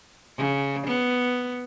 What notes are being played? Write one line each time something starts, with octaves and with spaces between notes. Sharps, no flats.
C#3
B3